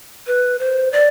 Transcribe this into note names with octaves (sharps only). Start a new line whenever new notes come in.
B4
C5
D5